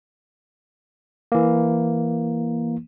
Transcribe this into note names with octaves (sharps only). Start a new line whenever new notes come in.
E3 A#3